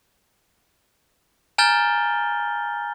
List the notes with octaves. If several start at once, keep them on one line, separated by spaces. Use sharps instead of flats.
G#5 A#5 F6 G6 A6 G7